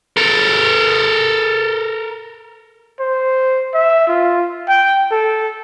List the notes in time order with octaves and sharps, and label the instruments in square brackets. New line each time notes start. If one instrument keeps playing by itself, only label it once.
[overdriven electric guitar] A4 A#4
[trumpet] C5
E5
F4
G5
A4